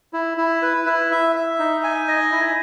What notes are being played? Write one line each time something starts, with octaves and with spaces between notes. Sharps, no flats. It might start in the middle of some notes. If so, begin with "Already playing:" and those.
E4
E4
B4
E4
E5
E5
D#4
G#5
D#5
E4